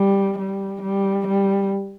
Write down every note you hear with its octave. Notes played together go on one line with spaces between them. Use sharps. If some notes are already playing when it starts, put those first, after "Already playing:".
Already playing: G3
G3
G3
G3